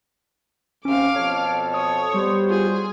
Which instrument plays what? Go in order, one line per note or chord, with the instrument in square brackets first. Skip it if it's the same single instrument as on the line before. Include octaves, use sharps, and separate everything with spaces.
[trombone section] D#2 C3 [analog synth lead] C#4 [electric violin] F5 D6
[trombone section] F2 B2 A4 [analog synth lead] C#5
[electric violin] C#5 [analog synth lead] D#6
[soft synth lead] G3 [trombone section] B3 F#4 C5
[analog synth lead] F4 [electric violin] G#4